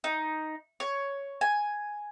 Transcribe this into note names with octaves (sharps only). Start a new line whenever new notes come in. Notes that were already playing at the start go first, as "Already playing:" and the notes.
D#4
C#5
G#5